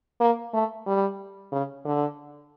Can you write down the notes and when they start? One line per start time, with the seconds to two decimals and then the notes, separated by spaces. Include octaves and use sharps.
0.21 A#3
0.54 A3
0.86 G3
1.52 C#3
1.85 D3